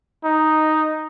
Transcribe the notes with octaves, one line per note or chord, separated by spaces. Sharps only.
D#4